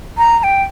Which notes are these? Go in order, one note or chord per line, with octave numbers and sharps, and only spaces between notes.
A#5
A#5
G5